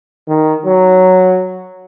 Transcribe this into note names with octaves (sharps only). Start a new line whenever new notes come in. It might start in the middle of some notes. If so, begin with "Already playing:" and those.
D#3
F#3